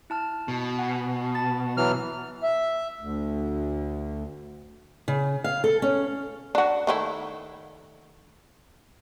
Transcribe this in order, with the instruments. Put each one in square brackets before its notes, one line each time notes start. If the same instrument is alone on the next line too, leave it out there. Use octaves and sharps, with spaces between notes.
[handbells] E4 A5 F6
[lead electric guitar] B2
[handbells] F#5 G#5
A5 A6
[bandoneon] E3 F#3 F6
[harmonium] E5
D2
[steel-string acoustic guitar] C#3
F5
A4
C#4
[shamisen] D4 F#4
D#3 A3 E4